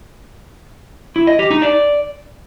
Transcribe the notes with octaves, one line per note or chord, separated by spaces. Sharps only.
E4
D#5
G4
D#4
D5